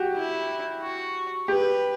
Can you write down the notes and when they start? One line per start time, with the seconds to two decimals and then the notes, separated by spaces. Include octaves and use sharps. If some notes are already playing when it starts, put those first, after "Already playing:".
Already playing: F#4 G4
0.15 E4
0.81 F#4
1.48 G4 B4